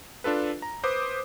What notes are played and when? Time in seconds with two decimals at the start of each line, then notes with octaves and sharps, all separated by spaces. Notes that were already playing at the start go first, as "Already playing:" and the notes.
0.24 D4 F4 A4 B4
0.62 A#5
0.83 B4 C5 D6 D#6